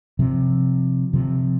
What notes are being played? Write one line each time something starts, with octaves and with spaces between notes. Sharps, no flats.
C3 F3
C3 F3